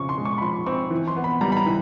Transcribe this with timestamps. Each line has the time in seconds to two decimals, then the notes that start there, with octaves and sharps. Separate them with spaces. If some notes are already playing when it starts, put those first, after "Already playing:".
Already playing: C#3 F3 C4 C#6
0.09 C6
0.18 G#3
0.25 C#6
0.38 B5
0.41 F3 C6
0.66 C4 C#6
0.91 E3
1.08 C6
1.16 B3
1.24 B5
1.41 G3 A#5
1.52 B5
1.57 A#5
1.66 E3